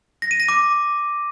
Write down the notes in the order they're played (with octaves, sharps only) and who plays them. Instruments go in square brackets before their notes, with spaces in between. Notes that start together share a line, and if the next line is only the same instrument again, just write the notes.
[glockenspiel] A#6
D#7
A#6
D6